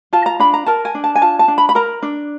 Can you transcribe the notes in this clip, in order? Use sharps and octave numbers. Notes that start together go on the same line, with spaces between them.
F4 A5
A#5
D4 B5
A#5
A#4 A5
G#5
D4
A5
G#5
F4 A5
A5
D4
B5
B5
A#4 A#5
D4